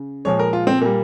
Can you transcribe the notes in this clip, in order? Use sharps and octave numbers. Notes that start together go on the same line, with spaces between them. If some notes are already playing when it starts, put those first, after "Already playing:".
Already playing: C#3
A#2 F3 G#3 C#5
A#4
F4
C4
A#2 G3 A#3